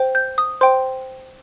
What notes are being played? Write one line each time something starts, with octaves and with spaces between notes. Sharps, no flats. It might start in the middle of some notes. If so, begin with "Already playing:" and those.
Already playing: C5 G5
G6
D#6
C5 G5 C6